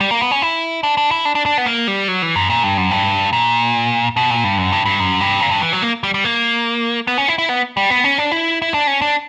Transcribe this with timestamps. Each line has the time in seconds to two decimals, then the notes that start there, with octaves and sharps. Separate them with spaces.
0.01 G3
0.11 A#3
0.21 B3
0.31 C#4
0.42 E4
0.83 D4
0.97 D4
1.11 E4
1.25 D4
1.35 D4
1.46 D4
1.58 B3
1.66 A#3
1.88 G3
2.08 F#3
2.22 E3
2.36 F#2
2.50 A#2
2.63 G2
2.77 F#2
2.91 G2
3.33 A#2
4.17 B2
4.30 A#2
4.44 G2
4.58 F#2
4.72 G2
4.85 G2
5.00 F#2
5.20 G2
5.41 A#2
5.51 G2
5.62 E3
5.73 F#3
5.82 A#3
6.03 G3
6.14 G3
6.24 A#3
7.07 B3
7.18 C#4
7.28 E4
7.38 E4
7.49 B3
7.77 G3
7.90 B3
8.04 C#4
8.18 D4
8.32 E4
8.62 E4
8.74 D4
8.87 C#4
9.02 D4